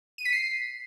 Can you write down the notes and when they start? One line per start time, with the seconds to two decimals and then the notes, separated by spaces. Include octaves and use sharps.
0.18 D#7
0.25 B6
0.32 C7